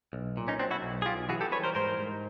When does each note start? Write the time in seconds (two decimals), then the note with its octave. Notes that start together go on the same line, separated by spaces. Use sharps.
0.13 B1
0.37 A#2
0.48 C#4 D#4
0.59 F#3 C4 D4
0.71 E4 F#4
0.83 B1
1.02 G#4
1.06 B1 F4 G4
1.29 E3 F#4 G#4
1.41 G4 A4
1.52 G3 B4 C#5
1.64 A#4 C5
1.75 G#2 A#4 C5
1.98 G#2